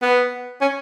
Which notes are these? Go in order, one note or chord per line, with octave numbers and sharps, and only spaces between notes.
B3
C#4